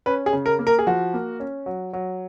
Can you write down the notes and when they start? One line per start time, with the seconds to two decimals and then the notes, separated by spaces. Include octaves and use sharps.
0.06 C#4 B4
0.26 G#4
0.33 C#3
0.46 A#4
0.59 A#3
0.67 A#4
0.79 G#4
0.87 F3 F#4
1.14 A#3
1.40 C#4
1.66 F#3
1.93 F#3